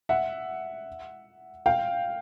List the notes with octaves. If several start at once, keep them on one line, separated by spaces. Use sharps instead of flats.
E5 F#5
F5 G5